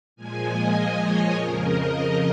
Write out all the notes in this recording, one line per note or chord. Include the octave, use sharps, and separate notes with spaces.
A#2 F3 G#3 G#5
D#5
D#5
C#5
F2 C#3 F3 A#4
D#5